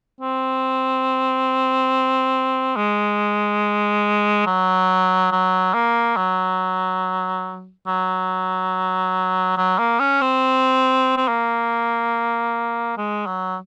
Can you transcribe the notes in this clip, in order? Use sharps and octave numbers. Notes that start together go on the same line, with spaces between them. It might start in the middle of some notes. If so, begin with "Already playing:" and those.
C4
G#3
F#3
F#3
A#3
F#3
F#3
F#3
A#3
C#4
C4
C4
A#3
G#3
F#3